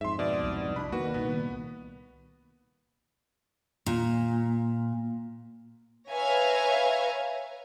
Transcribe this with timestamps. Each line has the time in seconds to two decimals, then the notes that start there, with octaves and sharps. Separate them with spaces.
0.01 F2 G#2 E5 C6
0.19 B2 D5
0.43 C2
0.76 D4 B5
0.92 D#3 A#3 F#4 B4
1.14 C2 A#2 B3
3.86 A#2
6.10 B4 C#5 E5 F5 G#5 A#5